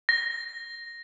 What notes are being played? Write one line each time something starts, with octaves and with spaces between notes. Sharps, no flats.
A#6